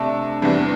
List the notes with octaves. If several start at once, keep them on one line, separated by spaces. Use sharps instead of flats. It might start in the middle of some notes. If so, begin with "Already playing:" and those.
Already playing: C3 A3 D4
E2 C3 E3 G3 D4